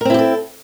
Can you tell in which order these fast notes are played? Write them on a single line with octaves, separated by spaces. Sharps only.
A#4 C4 E4 G4 A4